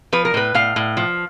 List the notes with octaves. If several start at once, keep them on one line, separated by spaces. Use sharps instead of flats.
F3 B4
A#4
A2 B4
A2 F5
A2
F3